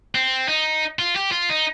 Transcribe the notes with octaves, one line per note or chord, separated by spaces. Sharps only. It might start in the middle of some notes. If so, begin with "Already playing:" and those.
C4
D#4
F4
G4
F4
D#4